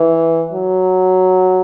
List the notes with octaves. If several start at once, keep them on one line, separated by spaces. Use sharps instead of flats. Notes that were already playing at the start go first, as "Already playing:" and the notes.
Already playing: E3
F#3